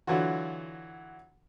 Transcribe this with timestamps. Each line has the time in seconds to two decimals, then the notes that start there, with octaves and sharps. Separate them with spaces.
0.07 D3 E3 F#3 F4 F#4